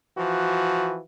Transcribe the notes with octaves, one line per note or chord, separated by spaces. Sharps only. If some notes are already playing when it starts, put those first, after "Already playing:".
E3 F3 F#4